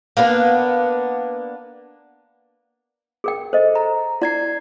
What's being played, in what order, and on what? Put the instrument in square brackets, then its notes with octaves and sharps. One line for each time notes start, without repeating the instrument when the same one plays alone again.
[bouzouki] A#3 B3 D4 B4
[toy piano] G#4 A#4 G5
[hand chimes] A4 [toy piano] C5 D#5
[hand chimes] A#5
[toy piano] E4 [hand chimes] D5 G#6 C7